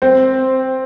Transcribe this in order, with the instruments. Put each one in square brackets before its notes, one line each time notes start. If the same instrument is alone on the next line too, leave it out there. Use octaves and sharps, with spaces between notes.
[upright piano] C4 C5